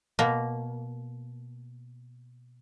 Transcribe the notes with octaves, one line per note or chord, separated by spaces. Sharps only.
B2 A#3